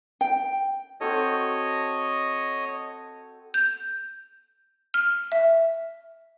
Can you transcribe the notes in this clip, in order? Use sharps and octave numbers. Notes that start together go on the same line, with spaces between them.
G5
C4 F#4 A4 C#5 D#5
G6
F6
E5